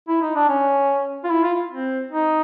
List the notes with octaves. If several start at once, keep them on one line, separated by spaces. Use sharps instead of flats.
E4
D#4
D4
C#4
F4
E4
F4
C4
D#4